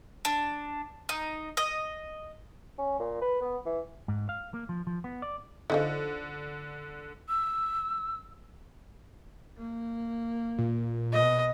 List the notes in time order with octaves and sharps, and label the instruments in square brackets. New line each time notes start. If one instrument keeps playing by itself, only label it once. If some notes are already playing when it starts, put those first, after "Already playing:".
[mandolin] D4
D#4
D#5
[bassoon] C#4
A#2
B4
B3
E3
[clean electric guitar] G#2
F5
A#3
F3
F3
B3
D5
[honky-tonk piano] D3 [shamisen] F3 D#4 E4
[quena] E6
[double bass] A#3
[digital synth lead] A#2
[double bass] B2 [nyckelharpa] D#5